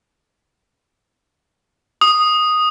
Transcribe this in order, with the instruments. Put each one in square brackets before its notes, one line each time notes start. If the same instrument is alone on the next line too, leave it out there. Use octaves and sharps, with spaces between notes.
[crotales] D#6